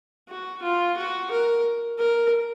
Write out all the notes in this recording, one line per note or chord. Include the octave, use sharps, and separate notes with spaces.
F#4
F4
F#4
A#4
A#4